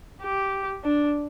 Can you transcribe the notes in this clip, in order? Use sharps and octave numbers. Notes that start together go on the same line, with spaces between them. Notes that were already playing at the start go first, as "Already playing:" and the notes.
G4
D4